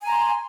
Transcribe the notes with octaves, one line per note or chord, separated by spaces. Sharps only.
G#5 A#5 C6